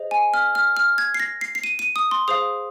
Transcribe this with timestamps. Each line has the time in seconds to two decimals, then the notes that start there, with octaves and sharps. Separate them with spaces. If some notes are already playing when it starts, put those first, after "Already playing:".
Already playing: G#4 C5 D#5
0.11 G#5
0.34 F6
0.55 F6
0.77 F6
0.98 G#6
1.14 C7
1.20 A#6
1.41 C7
1.55 C7
1.64 D#7
1.79 D#7
1.96 D#6
2.11 C6
2.28 G#4 C5 F5 D#6